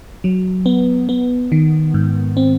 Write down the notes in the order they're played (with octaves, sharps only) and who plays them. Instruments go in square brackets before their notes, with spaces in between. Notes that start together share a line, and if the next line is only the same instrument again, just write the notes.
[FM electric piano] F#3
B3
B3
D#3
G#2
C4